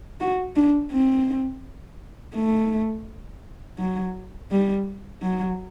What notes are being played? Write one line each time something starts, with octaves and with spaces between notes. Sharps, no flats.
F#4
D4
C4
A3
F#3
G3
F#3